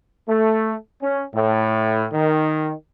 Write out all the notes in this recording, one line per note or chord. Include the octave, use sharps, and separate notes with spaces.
A3
C#4
A2
D#3